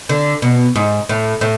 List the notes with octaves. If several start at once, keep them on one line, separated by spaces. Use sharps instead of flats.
D3
B2
G#2
A2
A2